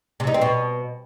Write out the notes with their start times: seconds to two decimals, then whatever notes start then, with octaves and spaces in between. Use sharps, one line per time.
0.20 C3
0.27 D#4
0.34 C4
0.41 B2